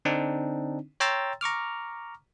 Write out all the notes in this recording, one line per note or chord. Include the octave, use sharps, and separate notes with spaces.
D3 C4 D4 D#4
C#5 G5 A#5 C6 E6 A6
A#5 C#6 D6 F6